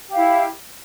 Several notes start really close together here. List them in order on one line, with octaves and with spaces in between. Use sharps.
G4 F5 E4